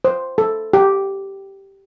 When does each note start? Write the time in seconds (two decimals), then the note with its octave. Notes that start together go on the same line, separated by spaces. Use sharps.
0.05 C5
0.38 A4
0.73 G4